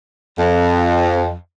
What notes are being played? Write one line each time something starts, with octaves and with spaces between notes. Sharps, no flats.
F2